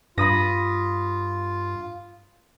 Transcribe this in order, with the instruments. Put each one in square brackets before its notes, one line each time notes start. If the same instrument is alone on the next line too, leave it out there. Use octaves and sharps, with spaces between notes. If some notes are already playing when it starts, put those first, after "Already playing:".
[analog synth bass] G2 [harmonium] F4 [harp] B5 D#6 A#6